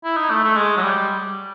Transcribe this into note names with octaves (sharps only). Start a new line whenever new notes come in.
E4
D#4
A3
A3
G#3
F#3
G3